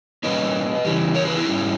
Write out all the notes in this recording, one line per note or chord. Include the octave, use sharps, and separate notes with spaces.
A#2 G3 C#4 B4 D#5
C#3 E3 G3
A#4 C#5
G#4 B4
E4 G#4
G#2 G3 C#4